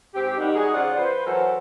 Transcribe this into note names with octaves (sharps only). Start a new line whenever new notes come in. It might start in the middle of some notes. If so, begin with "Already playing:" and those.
G#2 C4 G4
D#2 D#3 G3 D#4 F#5
D#4 F#4 G#4
C#3 F3 F4 D5 F#5
B4 C5
E3 F#3 A4 A#4 C5